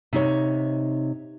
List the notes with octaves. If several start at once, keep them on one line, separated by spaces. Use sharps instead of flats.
C3 D#4 C#5